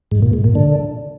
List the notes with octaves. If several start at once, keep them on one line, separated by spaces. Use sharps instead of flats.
G#2
A#2
G#2
A#2
D3